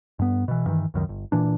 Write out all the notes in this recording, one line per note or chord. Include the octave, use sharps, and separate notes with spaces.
G2 B3
B2 E3
G2 D#3 E3
C#2 F#2 D#3
G1
A#2 E3 D4